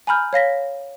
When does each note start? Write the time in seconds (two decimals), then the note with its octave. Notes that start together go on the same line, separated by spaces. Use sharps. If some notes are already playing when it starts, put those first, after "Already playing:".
0.07 G#5 A#5 B5 F6 G6
0.33 C#5 F5 A#6 B6